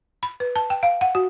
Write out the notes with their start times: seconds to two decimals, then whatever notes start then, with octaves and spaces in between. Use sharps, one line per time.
0.23 B5
0.40 B4
0.56 A5
0.70 G5
0.83 F5
1.01 F#5
1.15 F#4